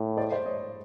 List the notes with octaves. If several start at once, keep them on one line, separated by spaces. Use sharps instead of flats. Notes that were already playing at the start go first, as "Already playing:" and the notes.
Already playing: A2
C5 D5
C5 D5
C#5 D#5